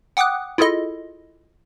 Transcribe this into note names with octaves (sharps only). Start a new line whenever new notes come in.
F#5 G5 D6 D#6 F#6
E4 F4 G#4 A4 D#5